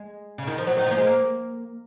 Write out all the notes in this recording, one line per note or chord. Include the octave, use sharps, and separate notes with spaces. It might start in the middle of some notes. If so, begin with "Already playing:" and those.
Already playing: G#3
C#3
D#3
F3
F#3
D#3
F3
A#3
G#3
A#3